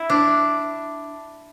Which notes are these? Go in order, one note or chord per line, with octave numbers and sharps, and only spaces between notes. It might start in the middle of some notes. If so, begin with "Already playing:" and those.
Already playing: E4
D4